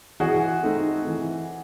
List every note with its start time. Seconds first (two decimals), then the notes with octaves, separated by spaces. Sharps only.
0.20 E3 F#4 G#4
0.63 A3 C4 D#4
1.07 E3